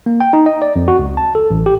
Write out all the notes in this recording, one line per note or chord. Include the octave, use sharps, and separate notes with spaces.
A#3
G5
D#4
D#5
D5
F2
F#4
C#2
A5
A4
A1
G4